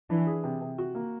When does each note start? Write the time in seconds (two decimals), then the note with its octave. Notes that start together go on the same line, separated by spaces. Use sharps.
0.10 E3 D4
0.27 G#4
0.44 C3
0.61 C3
0.78 F#4
0.95 A#3